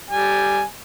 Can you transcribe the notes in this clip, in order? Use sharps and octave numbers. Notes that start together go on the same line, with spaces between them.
G3 G#5